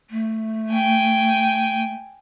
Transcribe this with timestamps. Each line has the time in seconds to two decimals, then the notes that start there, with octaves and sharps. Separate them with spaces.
0.10 A3
0.71 G5 G#5